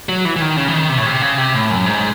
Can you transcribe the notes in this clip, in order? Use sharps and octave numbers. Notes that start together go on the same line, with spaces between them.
F#3
E3
E3
D#3
C#3
E3
D#3
C3
A2
C3
C#3
C3
A2
F#2
G#2